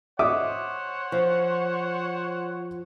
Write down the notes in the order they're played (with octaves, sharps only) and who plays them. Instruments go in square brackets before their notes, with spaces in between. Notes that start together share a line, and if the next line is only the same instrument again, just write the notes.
[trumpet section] C5 C#5 F#5 [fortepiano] E5 D6 D#6
[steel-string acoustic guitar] F3